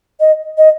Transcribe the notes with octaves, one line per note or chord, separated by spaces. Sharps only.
D#5
D#5